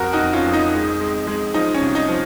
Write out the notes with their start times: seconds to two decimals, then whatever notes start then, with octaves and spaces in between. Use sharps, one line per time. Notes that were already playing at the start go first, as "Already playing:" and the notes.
Already playing: F2 F#4 A#4
0.13 D#4 F#4
0.20 F2
0.33 C#4 F4
0.46 F2
0.53 D#4
0.74 G#3
1.00 G#3
1.27 G#3
1.54 F3 D#4
1.74 C#4
1.81 C2
1.95 D#4
2.09 F3